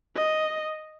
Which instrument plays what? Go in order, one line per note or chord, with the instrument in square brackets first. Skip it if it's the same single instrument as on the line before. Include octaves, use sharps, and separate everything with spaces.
[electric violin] D#5